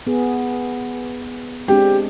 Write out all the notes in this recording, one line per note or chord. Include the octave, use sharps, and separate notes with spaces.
B3 G#4
G#3 C4 D4 G4